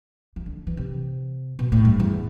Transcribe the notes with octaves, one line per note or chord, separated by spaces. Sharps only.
E3
D3
E3
C3
B2
A2
G2
E2